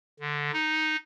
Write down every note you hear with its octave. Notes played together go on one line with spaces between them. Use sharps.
D3
D#4